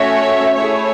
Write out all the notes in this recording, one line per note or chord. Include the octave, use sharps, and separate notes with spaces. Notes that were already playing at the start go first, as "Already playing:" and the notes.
Already playing: A3 C#4 F#4 C#5 E5
A3 E4 G#4 C#5 E5